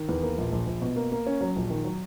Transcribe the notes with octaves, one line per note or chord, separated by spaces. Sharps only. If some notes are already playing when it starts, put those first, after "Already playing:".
Already playing: D#3
E2
A#3
A#1
A#1
A#1
B2
A#3
A#3
C#4
F#3
A#1
D#3
F#3